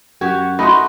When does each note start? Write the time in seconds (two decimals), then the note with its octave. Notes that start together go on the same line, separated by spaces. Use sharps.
0.21 F#2 F#4 G4 G#6
0.59 A3 D#4 F#4 B5 C6